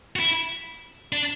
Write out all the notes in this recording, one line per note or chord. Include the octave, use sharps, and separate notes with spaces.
F#4
E4
D4